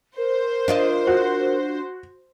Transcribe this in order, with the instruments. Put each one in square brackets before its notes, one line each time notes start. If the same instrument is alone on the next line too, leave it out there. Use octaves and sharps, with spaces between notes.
[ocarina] A#4 [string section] C5
[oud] D4 F4 D#5
[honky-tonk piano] F#4